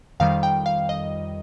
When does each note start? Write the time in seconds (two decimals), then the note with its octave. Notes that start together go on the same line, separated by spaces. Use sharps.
0.20 F2 D#3 G3 F5
0.43 G5
0.66 F5
0.89 D#5